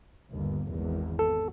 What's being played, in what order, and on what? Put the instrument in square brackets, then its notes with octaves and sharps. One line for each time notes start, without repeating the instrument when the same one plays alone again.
[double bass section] G1 D#2
G#1 E2
[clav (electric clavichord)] A4